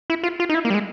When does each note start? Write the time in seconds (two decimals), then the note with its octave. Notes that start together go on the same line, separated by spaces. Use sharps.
0.10 E4
0.23 F4
0.40 F4
0.50 D#4
0.54 E4
0.65 A#3
0.70 G3
0.74 G#3